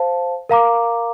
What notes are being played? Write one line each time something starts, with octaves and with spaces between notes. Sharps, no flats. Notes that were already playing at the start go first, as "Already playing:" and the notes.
Already playing: C5 F5 A5
A#4 F5 A#5 D6